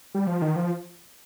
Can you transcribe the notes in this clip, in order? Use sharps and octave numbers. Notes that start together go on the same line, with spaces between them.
G3
F3
D#3
F3